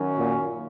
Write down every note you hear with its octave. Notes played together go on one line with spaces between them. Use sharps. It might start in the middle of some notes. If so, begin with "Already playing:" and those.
Already playing: F#2 D#3 F#3 C#4
A#2